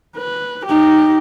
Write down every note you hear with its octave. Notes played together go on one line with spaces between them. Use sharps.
B4
D#4 G4